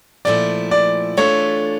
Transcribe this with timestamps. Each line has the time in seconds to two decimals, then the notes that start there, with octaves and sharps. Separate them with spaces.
0.25 A#2 F3 A3 E4 D5
0.71 D5
1.17 E3 A3 D4 F4 C#5